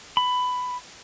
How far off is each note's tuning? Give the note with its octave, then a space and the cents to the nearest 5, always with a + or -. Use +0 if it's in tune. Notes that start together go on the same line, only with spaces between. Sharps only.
B5 +15